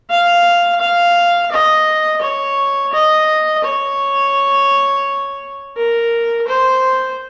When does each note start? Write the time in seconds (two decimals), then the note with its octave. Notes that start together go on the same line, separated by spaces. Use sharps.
0.10 F5
0.81 F5
1.52 D#5
2.22 C#5
2.93 D#5
3.64 C#5
5.77 A#4
6.48 C5